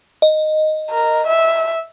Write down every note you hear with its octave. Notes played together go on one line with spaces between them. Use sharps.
D#5
A#4
E5